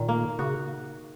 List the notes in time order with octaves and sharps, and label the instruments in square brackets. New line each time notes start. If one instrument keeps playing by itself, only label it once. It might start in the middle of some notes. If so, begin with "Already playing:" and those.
Already playing: [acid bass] A#2 [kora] D#3
[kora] A#3
[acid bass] C#3 [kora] F#4